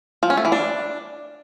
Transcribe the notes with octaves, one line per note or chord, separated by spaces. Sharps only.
F3
C#4
A3
E3
D4